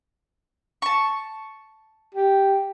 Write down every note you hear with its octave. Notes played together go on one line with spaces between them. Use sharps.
A5 C#6
G4